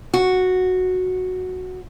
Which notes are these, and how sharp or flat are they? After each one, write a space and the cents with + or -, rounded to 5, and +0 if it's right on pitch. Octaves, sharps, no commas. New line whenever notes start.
F#4 -5